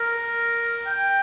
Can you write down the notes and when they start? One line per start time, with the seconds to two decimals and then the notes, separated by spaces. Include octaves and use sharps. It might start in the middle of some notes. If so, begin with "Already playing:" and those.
Already playing: A#4
0.86 G5